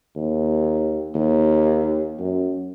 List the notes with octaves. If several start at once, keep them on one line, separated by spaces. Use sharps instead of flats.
D#2
D#2
F#2